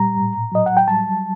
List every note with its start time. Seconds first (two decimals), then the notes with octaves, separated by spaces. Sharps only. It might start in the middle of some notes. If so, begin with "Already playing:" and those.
Already playing: A#2 G3 A#5
0.17 A2
0.52 F#3 D#5
0.66 F#5
0.77 G5
0.88 G3 A5